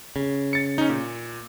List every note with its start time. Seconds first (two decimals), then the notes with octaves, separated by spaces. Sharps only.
0.16 C#3
0.53 A6 C#7
0.78 C#4 D#4
0.89 A#2